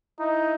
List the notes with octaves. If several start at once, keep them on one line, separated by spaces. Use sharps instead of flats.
D#4 E4